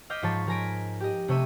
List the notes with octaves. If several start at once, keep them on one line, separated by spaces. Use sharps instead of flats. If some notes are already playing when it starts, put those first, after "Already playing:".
D#5 F5 D6 F6 G6 B6
G#2 F3 C#5 A5 A6
F3 A#4 G#5 A#6 B6 D7
G4 D#5
C3 A3 C#5 E5 D#7